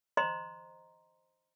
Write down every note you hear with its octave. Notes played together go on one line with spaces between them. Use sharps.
C5 D#5 A#5 C6